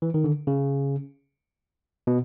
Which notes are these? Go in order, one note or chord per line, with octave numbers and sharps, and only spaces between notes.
E3
D#3
D3
C#3
B2